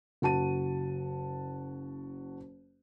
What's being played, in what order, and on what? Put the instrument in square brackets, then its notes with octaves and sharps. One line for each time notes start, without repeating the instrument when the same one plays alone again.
[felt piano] F#1 F#4 A5 D#7